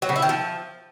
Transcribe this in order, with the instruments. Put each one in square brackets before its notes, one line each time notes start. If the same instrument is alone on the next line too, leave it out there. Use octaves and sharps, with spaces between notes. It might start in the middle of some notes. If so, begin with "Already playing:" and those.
[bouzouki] F#3
C#3
E4
D#3
F3